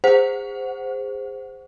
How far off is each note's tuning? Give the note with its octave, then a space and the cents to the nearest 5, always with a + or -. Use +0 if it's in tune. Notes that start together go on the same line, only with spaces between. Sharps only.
G#4 -30 C5 -5 F#5 +0